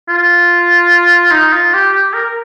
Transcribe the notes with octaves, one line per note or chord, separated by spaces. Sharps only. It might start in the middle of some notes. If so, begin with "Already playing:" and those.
F4
D#4
F4
G4
G4
A#4
A#4